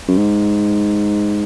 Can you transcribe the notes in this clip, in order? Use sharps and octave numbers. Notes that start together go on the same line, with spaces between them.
F#2
G#2